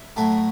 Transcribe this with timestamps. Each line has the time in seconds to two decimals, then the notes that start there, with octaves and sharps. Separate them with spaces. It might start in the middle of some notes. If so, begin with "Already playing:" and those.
Already playing: E5
0.16 A2 F#3 A3 E4